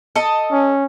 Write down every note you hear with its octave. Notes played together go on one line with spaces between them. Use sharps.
A4 D#5
C#4